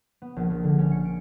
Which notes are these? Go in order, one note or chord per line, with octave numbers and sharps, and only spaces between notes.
B3
A#1
A#1
D3
C#4
C#7
D7